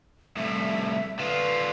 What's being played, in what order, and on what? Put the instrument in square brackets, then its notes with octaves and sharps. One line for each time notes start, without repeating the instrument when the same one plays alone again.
[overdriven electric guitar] C2 A2 [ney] E5
[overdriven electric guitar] D3 F4 [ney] B4